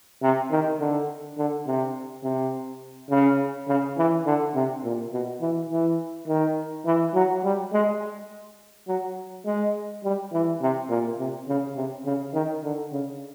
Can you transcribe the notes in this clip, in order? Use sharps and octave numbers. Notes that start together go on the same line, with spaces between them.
C3
D#3
D3
D3
C3
C3
C#3
C#3
E3
D3
C3
A#2
B2
E3
E3
D#3
E3
F#3
G3
G#3
F#3
G#3
G3
E3
C3
A#2
C3
C#3
C3
C#3
D#3
D3
C#3